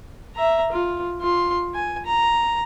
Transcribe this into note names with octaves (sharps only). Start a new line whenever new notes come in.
E5 A#5
F4
F4 C6
G#5
A#5